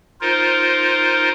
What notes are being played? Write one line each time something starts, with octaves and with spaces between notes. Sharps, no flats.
D#4 F4 A#4 C5